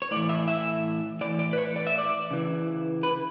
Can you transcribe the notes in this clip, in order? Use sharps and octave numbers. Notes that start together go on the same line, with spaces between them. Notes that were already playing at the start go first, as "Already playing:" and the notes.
C#5
A2 D5
E3
E5
E5
A2 E3 D5
D5
B4
C#5
D5
E5
D5
C#3 E3
B4